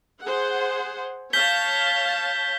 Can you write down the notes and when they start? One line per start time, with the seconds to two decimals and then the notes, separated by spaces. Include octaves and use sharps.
0.23 G#4 C5 F#5
1.33 C#5 F5 A5 G6 B6 G7